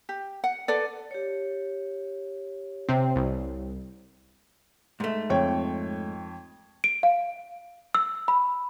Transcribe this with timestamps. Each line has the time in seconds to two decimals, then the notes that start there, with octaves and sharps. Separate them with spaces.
0.09 G4
0.44 F#5
0.68 A4 B4 D5
1.11 G4 C#5
2.89 C3 C4
3.16 C2
5.00 G#2 A3
5.30 F2 C#5 G5
6.84 D7
7.03 F5
7.95 E6
8.28 B5